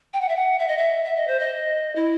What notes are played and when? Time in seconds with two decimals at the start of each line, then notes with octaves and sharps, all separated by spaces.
0.14 G5
0.21 F#5
0.29 E5
0.36 F#5
0.59 E5
0.68 D#5
0.78 E5
1.04 E5
1.16 D#5
1.27 C5
1.40 D#5
1.95 E4